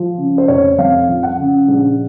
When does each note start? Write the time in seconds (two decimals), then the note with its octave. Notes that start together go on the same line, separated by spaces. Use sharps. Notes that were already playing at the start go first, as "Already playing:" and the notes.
Already playing: F3
0.18 C#3
0.38 C5
0.48 F1 C#5
0.78 F2 F5
1.08 F3
1.23 F#5
1.39 C#3
1.68 A#1